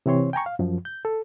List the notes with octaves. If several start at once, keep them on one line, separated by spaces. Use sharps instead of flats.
C3 E3 C4 C#5 C6
G5 G#5 A#5 C#6
F5
F#2 F3
G6
A4